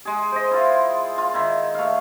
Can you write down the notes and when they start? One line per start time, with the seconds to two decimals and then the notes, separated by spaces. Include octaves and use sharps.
0.05 G#3 G#4
0.32 C5 D#5
0.51 E4 F4
1.18 F4
1.34 D#3 E4
1.74 A3 F5